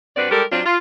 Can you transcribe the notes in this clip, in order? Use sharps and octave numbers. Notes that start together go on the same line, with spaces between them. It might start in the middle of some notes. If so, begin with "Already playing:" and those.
G2 C4 D4 F#4 B4 D5
G3 G#3 G4 A4 A#4
F#3 C4 D4 F4
F4